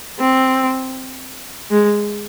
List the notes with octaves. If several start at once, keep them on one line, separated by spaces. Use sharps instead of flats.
C4
G#3